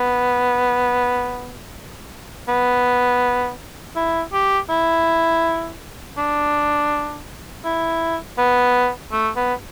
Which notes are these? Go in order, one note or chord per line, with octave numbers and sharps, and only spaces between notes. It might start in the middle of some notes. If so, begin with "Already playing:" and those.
Already playing: B3
B3
E4
G4
E4
D4
E4
B3
A3
B3